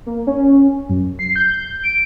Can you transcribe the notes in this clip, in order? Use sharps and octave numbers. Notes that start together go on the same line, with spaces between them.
A#3
C#4
F#2
C7
G6
D7